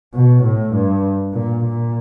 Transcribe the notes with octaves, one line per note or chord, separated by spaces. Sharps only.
B2
A2
G2
A#2
A#2